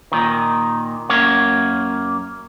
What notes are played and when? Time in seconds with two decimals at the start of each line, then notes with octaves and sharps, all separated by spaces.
0.12 A#2 D#3
1.09 F#2 A#3 C#5